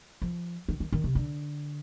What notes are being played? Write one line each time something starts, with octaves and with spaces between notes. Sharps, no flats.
F3
D#3
D#3
D#3
C3
D3